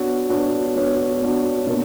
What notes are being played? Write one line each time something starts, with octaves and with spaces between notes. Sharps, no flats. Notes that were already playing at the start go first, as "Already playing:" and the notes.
Already playing: B3 D4 F#4 C#5
B3 D4 F#4 C#5
B3 D4 F#4 C#5
B3 D4 F#4 C#5
B2 A#3 D4